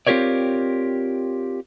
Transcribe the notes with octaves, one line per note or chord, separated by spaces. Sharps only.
C4 F4 G4 A#4 C#5 D5